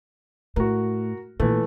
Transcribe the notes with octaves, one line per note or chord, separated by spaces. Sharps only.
A2 F#4 A#4
A#2 E3 A3